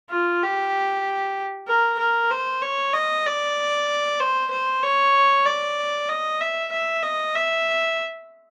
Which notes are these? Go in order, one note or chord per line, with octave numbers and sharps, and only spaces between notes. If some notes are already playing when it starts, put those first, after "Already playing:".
F4
G4
A#4
A#4
C5
C#5
D#5
D5
C5
C5
C#5
D5
D#5
E5
E5
D#5
E5